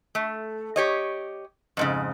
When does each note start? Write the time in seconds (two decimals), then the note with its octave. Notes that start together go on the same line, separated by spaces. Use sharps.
0.15 A3
0.76 G4 C#5 D#5
1.77 F2 G#2 C#3